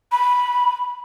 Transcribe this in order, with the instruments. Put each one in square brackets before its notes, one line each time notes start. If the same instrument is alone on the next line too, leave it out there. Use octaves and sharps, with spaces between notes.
[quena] B5